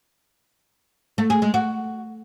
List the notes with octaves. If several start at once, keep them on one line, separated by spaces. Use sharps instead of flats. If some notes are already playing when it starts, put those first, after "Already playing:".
A3
G#4
G#3
F#4